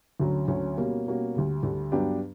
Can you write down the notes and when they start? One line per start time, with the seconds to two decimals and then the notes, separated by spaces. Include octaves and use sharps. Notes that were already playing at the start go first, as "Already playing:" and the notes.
0.20 D2 D3 F#3 C#4
0.48 D2 D3 F#3 C#4
0.77 B2 G3 A#3 C#4 F#4
1.06 B2 G3 A#3 C#4 F#4
1.35 D2 D3 G3
1.63 D2 D3 G3
1.92 G2 F#3 B3 D4 G4